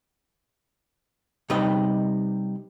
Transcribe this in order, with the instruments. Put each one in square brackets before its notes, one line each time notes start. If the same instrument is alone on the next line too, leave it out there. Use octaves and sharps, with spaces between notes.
[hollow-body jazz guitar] C3 G3 D#4 B4 D#5